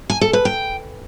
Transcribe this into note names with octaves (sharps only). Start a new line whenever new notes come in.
G#5
A4
B4
G5